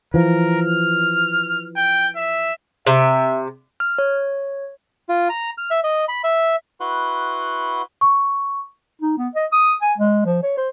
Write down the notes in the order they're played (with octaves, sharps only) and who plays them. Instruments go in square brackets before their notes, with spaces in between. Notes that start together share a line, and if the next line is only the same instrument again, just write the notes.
[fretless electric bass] E3 F3 [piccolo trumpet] A#4
[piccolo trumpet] F6
G5
E5
[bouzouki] C3 [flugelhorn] E5
[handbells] F6
C#5
[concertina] F4
A#5
F6
E5
D#5
B5
E5
E4 F#4 B4 F#5 C6
[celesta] C#6
[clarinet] D#4
B3
D#5
D#6
G#5
G#3
F3
C#5
C5